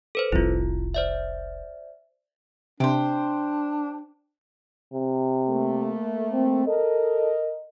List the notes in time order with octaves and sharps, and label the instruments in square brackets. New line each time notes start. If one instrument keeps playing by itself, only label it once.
[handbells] A4 B4 C5
[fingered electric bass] F1 C2 [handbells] E4 F4
[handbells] C5 D5 E5
[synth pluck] C3 [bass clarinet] D4 [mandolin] G4 C5
[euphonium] C3
[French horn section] A3 A#3
[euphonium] C4
[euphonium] A4 [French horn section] A#4 D#5